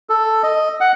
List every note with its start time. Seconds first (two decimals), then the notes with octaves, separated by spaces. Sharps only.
0.09 A4
0.43 D#5
0.81 F#5